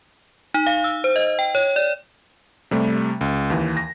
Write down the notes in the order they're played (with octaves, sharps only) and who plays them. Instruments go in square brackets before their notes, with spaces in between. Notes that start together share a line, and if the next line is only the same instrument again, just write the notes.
[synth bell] D#4
F5
E6
C5
D#5
G5
C#5
D5
[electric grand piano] C3 G3 A3
C#2
D#2 E3
A#6